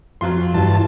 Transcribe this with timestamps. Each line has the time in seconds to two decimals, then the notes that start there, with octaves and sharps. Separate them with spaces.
0.21 F2 F#3 F4 C6
0.54 G2 E3 A5